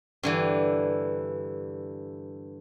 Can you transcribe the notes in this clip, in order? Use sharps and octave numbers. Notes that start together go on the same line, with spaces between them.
G2 D3 E3